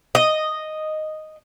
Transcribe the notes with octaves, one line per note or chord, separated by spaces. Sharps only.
D#5